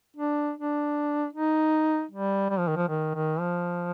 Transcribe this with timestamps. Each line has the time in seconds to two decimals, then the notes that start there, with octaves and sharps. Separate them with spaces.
0.17 D4
0.56 D4
1.33 D#4
2.11 G3
2.50 G3
2.59 F3
2.68 D#3
2.77 F3
2.89 D#3
3.15 D#3
3.40 F3